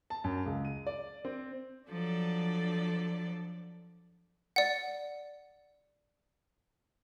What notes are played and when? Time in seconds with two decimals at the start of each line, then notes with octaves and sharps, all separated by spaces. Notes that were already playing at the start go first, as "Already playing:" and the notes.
0.10 A5
0.24 F#2
0.46 C#2
0.65 D#7
0.87 D5
1.25 C4
1.88 F3 F#3 D4 A4 D5
4.56 D5 F#5